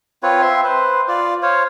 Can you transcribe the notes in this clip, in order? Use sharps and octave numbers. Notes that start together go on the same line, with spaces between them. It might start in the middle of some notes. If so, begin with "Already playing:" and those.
C4 F4 B4 C#5
C4 E5 C6
B4 C5
F4 D5
C5 C#5 F5